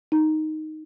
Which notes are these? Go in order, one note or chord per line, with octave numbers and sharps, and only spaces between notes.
D#4